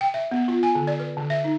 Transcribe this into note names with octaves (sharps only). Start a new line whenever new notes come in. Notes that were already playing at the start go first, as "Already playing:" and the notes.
G5
E5
B3
F4
G#5
D3
D5
B4
D3
E5
D#4